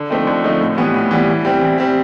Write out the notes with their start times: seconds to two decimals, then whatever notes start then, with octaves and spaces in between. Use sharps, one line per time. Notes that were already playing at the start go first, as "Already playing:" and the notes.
Already playing: D3
0.10 F3 A3 C4 D#4
0.27 D3
0.44 F3 A3 C4 D#4
0.61 A2
0.77 E3 G3 B3
0.94 A2
1.11 E3 G3 B3
1.27 E3
1.45 G3 C4
1.61 E3
1.78 G3 C4